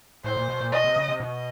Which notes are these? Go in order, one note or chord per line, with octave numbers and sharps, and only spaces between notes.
A2 C5
A#2
B2
A#2
B2 D#5
C3
C#3
C3
B2 D#5